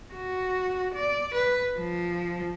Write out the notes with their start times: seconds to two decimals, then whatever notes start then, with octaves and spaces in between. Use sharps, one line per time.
0.13 F#4
0.94 D5
1.34 B4
1.79 F3